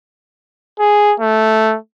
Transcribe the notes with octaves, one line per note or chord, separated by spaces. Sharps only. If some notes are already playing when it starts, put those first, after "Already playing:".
G#4
A3